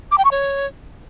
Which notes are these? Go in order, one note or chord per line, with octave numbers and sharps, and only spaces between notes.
D6
G5
C#6
C#5